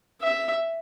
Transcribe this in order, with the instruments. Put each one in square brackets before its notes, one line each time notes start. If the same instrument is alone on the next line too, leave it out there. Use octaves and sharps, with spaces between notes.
[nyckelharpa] E5